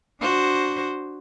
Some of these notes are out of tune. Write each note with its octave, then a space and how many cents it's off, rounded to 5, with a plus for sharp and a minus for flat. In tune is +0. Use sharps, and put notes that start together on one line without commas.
D4 +0 F#4 +0 C5 +0